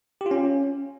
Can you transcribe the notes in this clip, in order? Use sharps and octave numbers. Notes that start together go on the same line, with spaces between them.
G4
F4
C#4